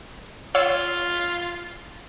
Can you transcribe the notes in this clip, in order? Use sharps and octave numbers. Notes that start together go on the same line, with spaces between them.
F4 C#5 F5 E6